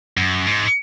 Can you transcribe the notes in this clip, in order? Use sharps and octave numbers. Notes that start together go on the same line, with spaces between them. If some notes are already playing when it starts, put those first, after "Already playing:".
F#2
G#2